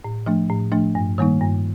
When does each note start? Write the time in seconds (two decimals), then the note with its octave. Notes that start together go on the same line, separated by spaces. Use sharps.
0.04 A2
0.26 F3 A3 D4
0.50 A2
0.72 F3 A3 D4
0.95 G2
1.18 D#3 G3 A#3 D#4
1.41 G2